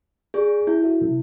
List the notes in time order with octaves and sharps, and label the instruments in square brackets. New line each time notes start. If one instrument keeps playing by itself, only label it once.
[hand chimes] G#4 [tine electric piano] D5 C#6 G6
[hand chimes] E4 [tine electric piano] G6
[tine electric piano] F#4 A4 E5
C3 F#3 C#4